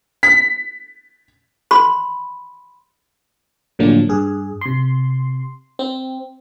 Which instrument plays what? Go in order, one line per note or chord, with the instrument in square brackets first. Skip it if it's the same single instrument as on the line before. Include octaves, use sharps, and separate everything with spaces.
[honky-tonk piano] B6
[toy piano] B5 C6
[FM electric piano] A2 D3 F3 F#3 A#3 D4
G2 G#4
C3 C6
C4